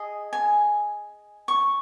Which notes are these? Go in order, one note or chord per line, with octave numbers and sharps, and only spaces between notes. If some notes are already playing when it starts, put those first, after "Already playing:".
Already playing: G#4 D#5 G#5
G#5
C#6